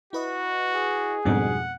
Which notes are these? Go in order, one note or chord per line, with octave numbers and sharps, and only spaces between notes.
E4 F#4 B4 D#5
G#4
F2 G#2 B2 G3 D4 F#5